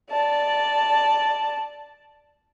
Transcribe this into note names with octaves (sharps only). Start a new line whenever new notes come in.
D5 A5